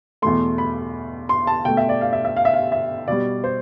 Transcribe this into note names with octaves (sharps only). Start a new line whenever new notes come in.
E2 B2 A3 C6
B5
C6
A5
B2 A3 G5
E5
D5
F5
E5
E5
F5
E5
F5
E5
B2 G3 D5
C5